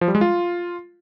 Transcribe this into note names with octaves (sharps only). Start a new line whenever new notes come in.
F3
G3
G#3
F4